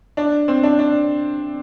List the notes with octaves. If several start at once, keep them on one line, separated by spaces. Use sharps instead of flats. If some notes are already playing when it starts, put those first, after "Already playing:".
D4
C4
D4
D4